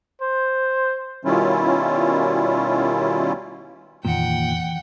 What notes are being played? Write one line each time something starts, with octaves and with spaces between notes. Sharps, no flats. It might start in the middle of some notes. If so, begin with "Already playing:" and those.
C5
B2 D#3 G3 C#4 E4 F4
F1 D#2 A#2 E3 F#5 G5